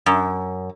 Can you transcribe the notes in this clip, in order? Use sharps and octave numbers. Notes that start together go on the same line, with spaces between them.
F#2